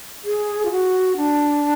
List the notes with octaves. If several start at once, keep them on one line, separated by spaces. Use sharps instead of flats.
G#4
F4
F#4
D4